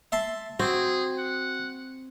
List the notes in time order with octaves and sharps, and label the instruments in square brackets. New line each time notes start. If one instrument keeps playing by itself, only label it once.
[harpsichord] E5 A5 C6
[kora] C4 [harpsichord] F#4 [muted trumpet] G#4
[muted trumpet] F#5